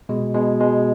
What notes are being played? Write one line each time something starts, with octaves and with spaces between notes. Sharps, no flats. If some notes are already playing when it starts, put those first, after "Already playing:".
B2 G#3
B2 G#3
B2 G#3